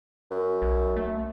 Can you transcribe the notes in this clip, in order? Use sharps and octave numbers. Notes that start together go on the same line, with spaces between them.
F#2
B1
A3